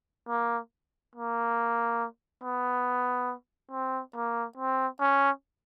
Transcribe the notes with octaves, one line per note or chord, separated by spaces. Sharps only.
A#3
A#3
B3
C4
A#3
C4
C#4